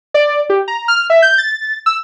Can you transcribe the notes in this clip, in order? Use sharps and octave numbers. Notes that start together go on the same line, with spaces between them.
D5
G4
A#5
F6
E5
G6
A6
E6